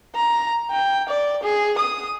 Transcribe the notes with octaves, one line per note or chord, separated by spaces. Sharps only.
A#5
G5
D5
G#4
D#6